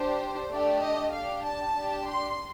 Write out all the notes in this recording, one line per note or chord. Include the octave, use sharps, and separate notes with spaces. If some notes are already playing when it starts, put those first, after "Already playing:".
Already playing: D4 G4 C5
A3 D4 G4 D5
D#5
D4 G4 F5
A5
D4 G4
C6